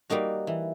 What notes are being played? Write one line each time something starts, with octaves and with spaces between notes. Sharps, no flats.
G3 A#3 D#4 F#4
E3